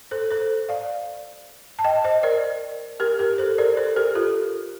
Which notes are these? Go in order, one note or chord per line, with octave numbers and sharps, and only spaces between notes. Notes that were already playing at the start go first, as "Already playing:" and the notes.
A4 C5
A4 C5
D5 F5
A5
D#5 G5
C5 D#5
A#4 D5
G4 A#4
G4 A#4
A4 C5
A#4 D5
A4 C5
G4 A#4
F4 A4